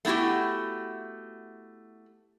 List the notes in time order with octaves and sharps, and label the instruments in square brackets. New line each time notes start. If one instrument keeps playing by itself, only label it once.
[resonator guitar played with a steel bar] A3 B3 E4 F#4 G4